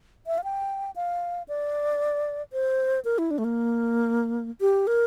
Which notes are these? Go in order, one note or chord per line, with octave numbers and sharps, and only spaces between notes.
E5
F5
G5
F5
D5
C5
A#4
E4
D4
A3
A#3
G4
A#4